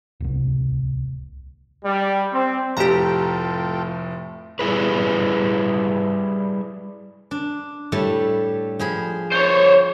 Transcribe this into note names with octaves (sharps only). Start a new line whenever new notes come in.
D1 C2
G3
C4
F1 A2 F4 G4 A4 G5 A#5 E7
G3 E4 G#4 B4
D4
A2 G3 A3
F3 G#4 B5
C5 C#5